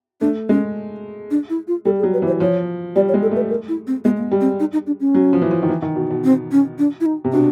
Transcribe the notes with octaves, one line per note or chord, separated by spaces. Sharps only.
A3 D4
G#3 C#4
D4
E4
F4
G3 A4
G#4
F#3
B4
E3
C5
F3 C#5
G3 D5
C#5
G#3
A4
A3 B4
A#4
E4
C4
G#3 B3
A#3
B3
G3
C4
D#4
D#4
D4
C#4
F#3
F3
E3
F3
D#3
E3
D#3
B2
B2
C4
C#4
D4
E4
D#4
C3
B2 D4